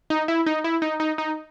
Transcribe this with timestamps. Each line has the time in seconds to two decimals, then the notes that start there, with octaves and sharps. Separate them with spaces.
0.10 D#4
0.28 E4
0.46 D#4
0.64 E4
0.82 D#4
1.00 D#4
1.18 D#4